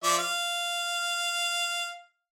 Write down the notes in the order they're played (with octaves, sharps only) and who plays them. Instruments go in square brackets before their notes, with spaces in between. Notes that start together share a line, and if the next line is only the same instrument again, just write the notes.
[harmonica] F3 D5 E5
F5